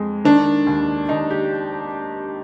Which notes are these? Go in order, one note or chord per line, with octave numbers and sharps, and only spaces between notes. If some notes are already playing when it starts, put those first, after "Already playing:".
Already playing: F2 G#3
D#3 D4
D#2
D#2 D#4
G4